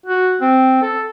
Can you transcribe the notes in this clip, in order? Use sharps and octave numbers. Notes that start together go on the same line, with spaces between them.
F#4
C4
A4